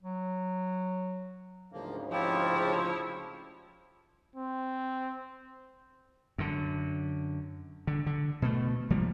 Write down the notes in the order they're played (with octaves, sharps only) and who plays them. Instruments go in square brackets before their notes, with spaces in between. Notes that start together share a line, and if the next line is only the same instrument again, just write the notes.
[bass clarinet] F#3
[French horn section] D2 G#2 C#3 [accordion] F3 A#3
[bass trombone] F3 [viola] E4 C#5 [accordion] F4 G4
[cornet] C4
[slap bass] F#2 D3
D3
D3
B2 A3
C2 F3 G3 A#3